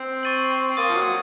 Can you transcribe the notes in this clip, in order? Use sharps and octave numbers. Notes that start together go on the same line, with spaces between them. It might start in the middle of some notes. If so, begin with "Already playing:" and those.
Already playing: C4
C#6 A6 D#7 F#7
A#3 D#6 A6 D#7
F3
F#3